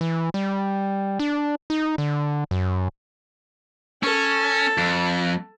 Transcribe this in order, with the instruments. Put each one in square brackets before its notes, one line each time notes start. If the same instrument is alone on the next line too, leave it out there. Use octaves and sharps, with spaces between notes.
[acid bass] E3
G3
D4
D#4
D3
F#2
[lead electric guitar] C#4 [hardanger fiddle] A4
[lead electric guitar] F2